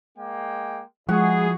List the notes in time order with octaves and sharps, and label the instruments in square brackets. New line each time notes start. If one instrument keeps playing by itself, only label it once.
[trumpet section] G#3 A#3 G5
[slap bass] F3 [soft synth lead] G#3 [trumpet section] E4 G#4 [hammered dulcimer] F#4